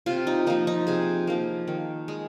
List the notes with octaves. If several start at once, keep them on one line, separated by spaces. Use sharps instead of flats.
C3 F4
D#4
F3 A#3 D#4
D#4
C3 G#4
F3 A#3
D#3
G#3